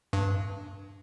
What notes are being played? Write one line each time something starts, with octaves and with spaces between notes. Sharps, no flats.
G2